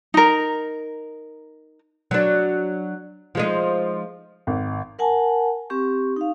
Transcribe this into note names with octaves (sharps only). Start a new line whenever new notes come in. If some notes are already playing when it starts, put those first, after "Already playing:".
D#4 A#4
F#3 D4
F3 G#3 D#4
G#1
A#4 F#5 G#5 A5
C4 G4 C#6
D#4 F5